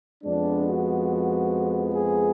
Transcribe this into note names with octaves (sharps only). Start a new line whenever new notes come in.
F2 F3 G#3 B3 D4
F#4
G#4